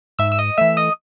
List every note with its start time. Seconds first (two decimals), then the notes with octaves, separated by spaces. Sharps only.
0.19 G#2 E5 E6
0.32 E6
0.39 D#5 D#6
0.58 E3 A3 E5 E6
0.77 D#5 D#6